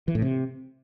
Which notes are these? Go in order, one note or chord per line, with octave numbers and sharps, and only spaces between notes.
E3
A2
C3